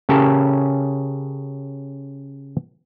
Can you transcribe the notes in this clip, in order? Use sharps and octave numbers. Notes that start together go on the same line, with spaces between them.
C#3 C#4 G4 A4 A#4